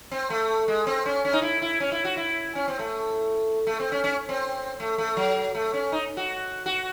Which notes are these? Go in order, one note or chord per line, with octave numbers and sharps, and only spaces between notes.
C4
A3
G#3
C4
C#4
C#4
D#4
E4
E4
C#4
E4
F#4
E4
C#4
C4
A3
A3
C4
C#4
C#4
C4
A3
A3
F#3
A3
C#4
D#4
F#4
F#4